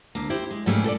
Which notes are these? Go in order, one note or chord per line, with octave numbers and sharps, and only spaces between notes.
D2 A#3
G3 E4 G4 C5
G#3
G#2 G3 A3 A#3 C#4 G#4
A2 A4 C5 D5